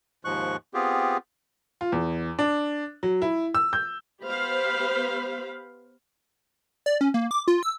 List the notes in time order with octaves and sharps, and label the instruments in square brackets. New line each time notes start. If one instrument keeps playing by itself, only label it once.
[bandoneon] D#2 G#2 F3 C#6 F#6
B3 C4 F4 G4 G#4
[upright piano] F4
E2
D4
F#3
E4
E6
G6
[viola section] B3 G4 C5 F5 B5
[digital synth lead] D5
C#4
A#3
D6
F4
E6